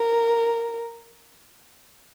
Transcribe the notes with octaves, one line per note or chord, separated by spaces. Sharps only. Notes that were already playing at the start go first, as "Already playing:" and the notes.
Already playing: A#4